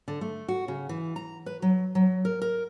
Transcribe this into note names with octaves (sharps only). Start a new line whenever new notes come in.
D3
A3
F#4
C#3
E3
A#5
B4
F#3
F#3
A#4
A#4